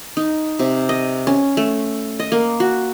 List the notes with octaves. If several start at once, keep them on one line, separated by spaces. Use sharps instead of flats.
D#4
C3
D#5
C#4
A3
D#5
A#3
F#4